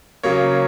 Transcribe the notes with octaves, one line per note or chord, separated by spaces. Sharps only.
C#3 F#3 A#3 C#5